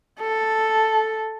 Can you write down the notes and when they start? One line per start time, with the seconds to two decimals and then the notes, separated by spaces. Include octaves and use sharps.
0.21 A4